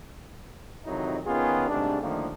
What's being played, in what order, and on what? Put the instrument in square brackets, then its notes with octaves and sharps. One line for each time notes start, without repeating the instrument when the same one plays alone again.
[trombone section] F2 C3 D#3 F#3 D#4 E4
D#3 B3 C#4 F4 G#4
G#2 C3 G3 A3 D4
A2 D3 D#3 F3 A3 A#3